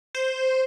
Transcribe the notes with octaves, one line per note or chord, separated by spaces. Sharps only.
C5